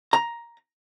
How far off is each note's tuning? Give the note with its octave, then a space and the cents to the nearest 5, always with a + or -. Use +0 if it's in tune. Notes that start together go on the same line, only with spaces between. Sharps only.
A#5 +10